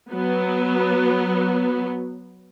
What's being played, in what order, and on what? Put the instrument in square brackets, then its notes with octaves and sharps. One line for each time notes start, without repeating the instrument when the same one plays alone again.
[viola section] F#3 B3